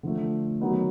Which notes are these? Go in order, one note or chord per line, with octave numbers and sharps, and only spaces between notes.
D3 F3 A3
D#3 F#3 B3 D#4